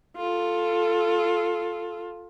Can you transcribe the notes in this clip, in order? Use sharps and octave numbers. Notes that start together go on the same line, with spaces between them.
F4 A4